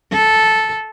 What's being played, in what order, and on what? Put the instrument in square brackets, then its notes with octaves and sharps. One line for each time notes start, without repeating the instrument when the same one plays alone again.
[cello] A4